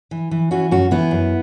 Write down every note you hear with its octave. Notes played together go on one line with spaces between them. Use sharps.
E3
E3
E3 C#4 F#4
F#2 C#4 F#4
E3 B3 E4
F#2